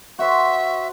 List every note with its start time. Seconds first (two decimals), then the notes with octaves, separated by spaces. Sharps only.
0.19 F#4 C5 E5